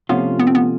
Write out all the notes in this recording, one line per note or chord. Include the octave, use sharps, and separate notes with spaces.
C3 F3 A3 B3 C#4 F4
B3
C4
B3